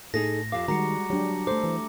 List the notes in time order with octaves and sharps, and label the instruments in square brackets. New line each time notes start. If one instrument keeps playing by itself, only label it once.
[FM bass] A2 [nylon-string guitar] D#4 G#4 A4 [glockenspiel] A#6
[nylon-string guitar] F2 G4 F5 [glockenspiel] D6
[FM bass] D#3 [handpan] G3 F#4 [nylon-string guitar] G#3 [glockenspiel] A#5 C#7
[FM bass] F#3 [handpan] D4 G4
[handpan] A3 A4 [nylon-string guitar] C5 [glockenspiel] D6
[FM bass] E3